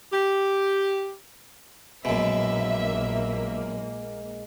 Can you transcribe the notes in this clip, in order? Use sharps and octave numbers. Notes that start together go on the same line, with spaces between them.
G4
A#1 F#2 B2 G#3 A#3 E5